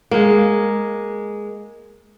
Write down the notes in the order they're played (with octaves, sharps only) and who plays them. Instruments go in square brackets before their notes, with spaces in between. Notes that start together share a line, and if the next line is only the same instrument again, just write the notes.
[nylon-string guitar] G#3 A#3